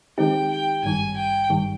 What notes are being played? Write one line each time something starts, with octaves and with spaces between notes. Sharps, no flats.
D#3 G#3 C4 D#4 G4 G5
G5
G#1 G2 D#3 G3 G#5
G5
G#1 G2 D#3 G3